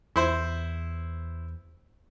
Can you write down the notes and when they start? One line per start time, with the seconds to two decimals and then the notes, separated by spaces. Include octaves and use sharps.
0.16 E2 E4 C5